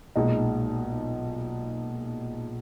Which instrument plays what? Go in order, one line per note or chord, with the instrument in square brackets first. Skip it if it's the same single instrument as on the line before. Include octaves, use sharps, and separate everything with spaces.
[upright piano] B1 A#2 G#3 D#4